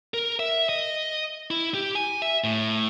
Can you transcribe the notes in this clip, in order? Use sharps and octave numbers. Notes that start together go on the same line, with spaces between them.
A#4
E5
D#5
E4
G4
G#5
E5
A2